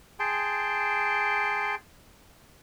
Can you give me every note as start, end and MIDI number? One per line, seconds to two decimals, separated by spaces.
0.20 1.75 68
0.20 1.75 79
0.20 1.75 81
0.20 1.75 84